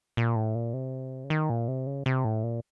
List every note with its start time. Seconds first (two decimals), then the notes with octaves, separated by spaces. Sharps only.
0.17 A#2
0.36 A2
0.55 A#2
0.74 C3
1.24 C#3
1.30 D#3
1.50 A#2
1.68 C3
1.87 C#3
2.06 C3
2.25 A2
2.44 A#2